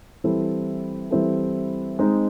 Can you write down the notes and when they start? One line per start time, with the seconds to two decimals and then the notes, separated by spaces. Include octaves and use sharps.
0.24 E3 G3 C4 E4 A4
1.11 E3 G3 C4 E4 A4
1.99 G#3 C4 D#4